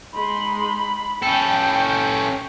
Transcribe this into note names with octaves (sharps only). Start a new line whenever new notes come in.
G#3 D#4 B5 C6
C#4 A4 G5 B5
C#6